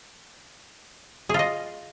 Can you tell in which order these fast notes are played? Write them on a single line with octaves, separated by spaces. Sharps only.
G#4 F4 D#5